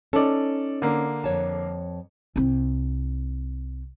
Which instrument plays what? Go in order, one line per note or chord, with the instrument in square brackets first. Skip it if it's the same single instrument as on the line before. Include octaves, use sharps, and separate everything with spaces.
[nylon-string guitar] C#4 D#4 [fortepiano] A4 D5
[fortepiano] D3 A#3
[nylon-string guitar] F2 C#5 A5
[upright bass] C2 C4